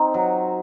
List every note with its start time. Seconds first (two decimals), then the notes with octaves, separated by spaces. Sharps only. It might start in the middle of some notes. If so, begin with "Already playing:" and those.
Already playing: C4 D#4
0.14 F#3